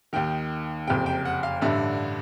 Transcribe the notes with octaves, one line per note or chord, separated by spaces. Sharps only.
D#2 D#3 G5
F#1 F2 C3 G5
G5
F#5
F5
A1 G2 D3 E5